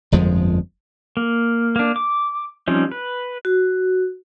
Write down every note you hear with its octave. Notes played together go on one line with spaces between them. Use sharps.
G1 F2 F3 G#3
A#3
A#3 D4
D6
F3 G3 C4 C#4 D#4
B4
F#4